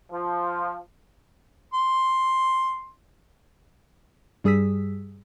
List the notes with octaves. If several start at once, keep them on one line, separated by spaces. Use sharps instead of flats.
F3
C6
G2 G3 G#4 D#6 E6 B6